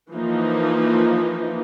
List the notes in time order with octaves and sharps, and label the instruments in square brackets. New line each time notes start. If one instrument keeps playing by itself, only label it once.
[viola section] E3 F3 A#3 D#4